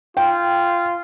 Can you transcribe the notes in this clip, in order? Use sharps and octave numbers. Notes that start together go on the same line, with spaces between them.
F4 G5